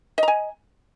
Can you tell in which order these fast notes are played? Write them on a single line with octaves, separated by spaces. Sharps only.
D#5 A#5 G#5